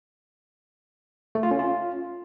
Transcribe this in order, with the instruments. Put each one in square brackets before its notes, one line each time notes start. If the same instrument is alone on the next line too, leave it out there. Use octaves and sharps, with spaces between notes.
[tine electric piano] A3
F4
C#4
F4